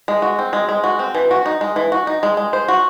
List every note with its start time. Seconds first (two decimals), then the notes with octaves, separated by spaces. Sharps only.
0.08 G#3
0.22 F#4
0.39 C4
0.53 G#3
0.69 G#3
0.84 F#4
0.99 C4
1.15 E3
1.31 F#4
1.46 D#4
1.61 G#3
1.76 E3
1.92 F#4
2.07 D#4
2.23 G#3
2.37 G#3
2.53 C5
2.68 F#4